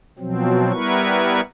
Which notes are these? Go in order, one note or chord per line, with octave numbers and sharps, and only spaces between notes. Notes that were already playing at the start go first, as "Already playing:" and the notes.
B2 F3 F#3 C4
G3 B3 E4 A#4 B4 C#6